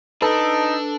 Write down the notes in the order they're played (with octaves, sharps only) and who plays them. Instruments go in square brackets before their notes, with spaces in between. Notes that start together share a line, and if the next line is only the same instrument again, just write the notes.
[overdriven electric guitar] D4 [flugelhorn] D#4 [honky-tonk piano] A4 [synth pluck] B4